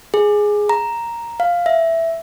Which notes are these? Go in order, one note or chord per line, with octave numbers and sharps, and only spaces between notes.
G#4
A#5
F5
E5